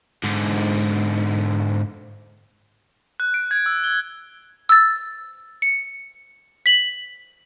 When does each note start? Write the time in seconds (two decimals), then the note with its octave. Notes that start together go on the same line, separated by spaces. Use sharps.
0.24 G#2 D3
3.20 F#6
3.34 D7
3.51 G#6
3.66 E6
3.84 G7
4.69 E6 A6
5.62 C#7
6.66 B6 F#7